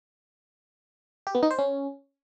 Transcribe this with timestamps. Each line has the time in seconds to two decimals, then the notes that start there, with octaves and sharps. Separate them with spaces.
1.27 G4
1.35 B3
1.43 D#4
1.51 C5
1.59 C#4